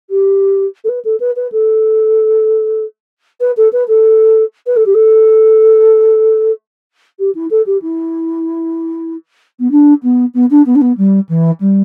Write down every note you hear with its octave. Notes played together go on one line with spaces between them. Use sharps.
G4
A4
B4
A4
B4
B4
A4
B4
A4
B4
A4
B4
A4
G4
A4
G4
E4
A4
G4
E4
B3
D4
B3
B3
D4
B3
D4
B3
G3
E3
G3